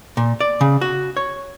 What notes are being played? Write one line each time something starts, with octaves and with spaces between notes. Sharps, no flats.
A#2
D5
C#3
F#4
C#5